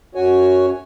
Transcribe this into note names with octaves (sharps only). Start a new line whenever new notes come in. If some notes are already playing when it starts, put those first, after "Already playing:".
F#2 F#4 C#5 G#5